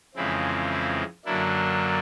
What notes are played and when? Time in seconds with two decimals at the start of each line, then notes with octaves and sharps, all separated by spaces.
0.15 F2 C#3 E3 G#3 C4 E4
0.71 E4
1.25 F#2 D3 F#3 A#3 D4 E4